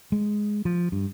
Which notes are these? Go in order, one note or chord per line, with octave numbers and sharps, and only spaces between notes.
G#3
F3
G2